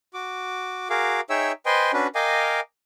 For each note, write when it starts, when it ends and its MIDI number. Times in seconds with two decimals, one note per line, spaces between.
0.14 0.88 66
0.14 0.88 86
0.90 1.21 66
0.90 1.21 68
0.90 1.21 70
0.90 1.21 77
0.90 1.21 86
1.30 1.52 63
1.30 1.52 68
1.30 1.52 73
1.30 1.52 76
1.30 1.52 79
1.30 1.52 88
1.66 1.92 71
1.66 1.92 72
1.66 1.92 75
1.66 1.92 79
1.66 1.92 80
1.66 1.92 84
1.93 2.07 61
1.93 2.07 62
1.93 2.07 66
1.93 2.07 71
2.15 2.60 70
2.15 2.60 75
2.15 2.60 77
2.15 2.60 79
2.15 2.60 80
2.15 2.60 86